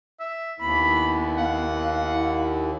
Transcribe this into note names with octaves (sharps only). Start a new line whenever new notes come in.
E5
D#2 B3 E4 B5
F5 F#5
E4